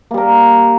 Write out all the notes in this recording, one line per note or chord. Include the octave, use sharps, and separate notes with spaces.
G3 A#3 A#4